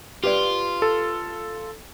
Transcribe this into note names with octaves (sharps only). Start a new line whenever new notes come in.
F4 G4 B4 D5
A4